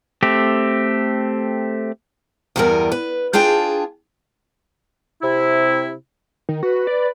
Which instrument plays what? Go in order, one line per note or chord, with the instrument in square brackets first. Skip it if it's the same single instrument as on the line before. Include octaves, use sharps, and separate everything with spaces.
[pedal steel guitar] A3 C4 G4
[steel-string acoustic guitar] E2 G2 G3 B3 A#4 G#5
B4
D4 F4 G#4 G5 A5
[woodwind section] C3 E4
[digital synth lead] D#3
[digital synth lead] F#4 [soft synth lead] B4
[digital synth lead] D5